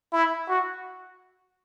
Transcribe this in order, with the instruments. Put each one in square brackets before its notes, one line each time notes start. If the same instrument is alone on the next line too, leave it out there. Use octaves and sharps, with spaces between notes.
[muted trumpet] E4
F#4